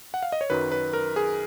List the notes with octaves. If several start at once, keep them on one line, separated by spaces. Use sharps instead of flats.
F#5
F5
D#5
C#5
F#2 D#3 F#3 B4
B4
A#4
G#4